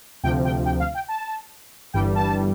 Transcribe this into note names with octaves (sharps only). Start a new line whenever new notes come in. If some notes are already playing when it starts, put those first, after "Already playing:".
D2 C3 F3 G5
G5
G5
F5
G5
A5
G1 G2 E3 G3 G5
A5